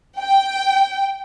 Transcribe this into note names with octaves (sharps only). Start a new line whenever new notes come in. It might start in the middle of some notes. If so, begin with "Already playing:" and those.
G5